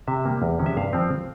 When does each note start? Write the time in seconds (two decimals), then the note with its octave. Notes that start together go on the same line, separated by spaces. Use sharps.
0.07 C3 E5
0.25 G3 A#3
0.42 E2
0.59 C3 F3 G#3 C#4
0.66 E5
0.77 G2 F5
0.93 F3 C4